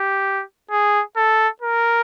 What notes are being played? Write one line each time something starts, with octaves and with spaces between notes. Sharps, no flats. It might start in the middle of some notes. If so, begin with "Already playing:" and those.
Already playing: G4
G#4
A4
A#4